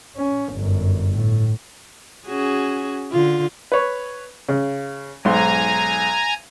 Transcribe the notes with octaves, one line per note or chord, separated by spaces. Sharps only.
C#4
G1 F#2
A2
C#4 F#4 G#4
D3 F4
B4 C#5
C#3
B1 G#2 G#5 A#5 C6